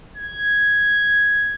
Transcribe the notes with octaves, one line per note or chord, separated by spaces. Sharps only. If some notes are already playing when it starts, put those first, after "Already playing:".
G#6